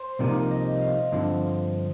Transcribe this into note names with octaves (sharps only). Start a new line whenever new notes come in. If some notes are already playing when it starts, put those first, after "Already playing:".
Already playing: C5
C2 C3 F3 A#3 D#4 D5
D#5
F5
G2 D3 F3 C4